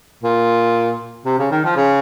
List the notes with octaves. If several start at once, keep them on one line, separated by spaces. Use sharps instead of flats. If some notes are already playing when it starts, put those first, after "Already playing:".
A#2
C3
C#3
D#3
F3
C#3